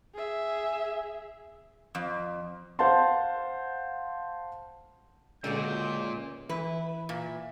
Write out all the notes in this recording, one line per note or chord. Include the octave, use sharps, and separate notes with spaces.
G#4 E5
F2
C5 F5 F#5 A5 C6
C#2 A#2 D3 F#4 G#4 G6
E3 E4 B4
A#2 E5